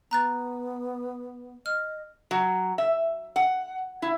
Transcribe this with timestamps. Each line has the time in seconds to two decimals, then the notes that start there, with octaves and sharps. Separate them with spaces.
0.11 B3 A#5 F#6 A6
1.66 D#5 F6
2.31 F#3
2.78 E5
3.36 F#5
4.02 E4